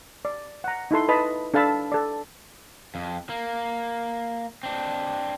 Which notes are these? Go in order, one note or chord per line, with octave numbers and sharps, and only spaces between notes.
D5
F#5 A#5
D#4 E4 A4 C6
B4 D#5 A5 B5
D4 A4 F5 A5 B5 E6
A4 D5
F2
A#3
C4 D4